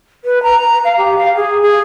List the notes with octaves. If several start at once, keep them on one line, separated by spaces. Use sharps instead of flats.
B4
A#5
F5
G4
F5
G#4
G#4